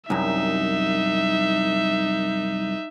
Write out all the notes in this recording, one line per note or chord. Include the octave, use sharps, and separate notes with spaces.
C2 F#2 D#4 E5